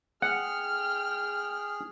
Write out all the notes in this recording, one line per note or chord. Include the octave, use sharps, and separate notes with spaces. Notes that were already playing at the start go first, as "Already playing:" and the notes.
G#4 F#5 G5 F6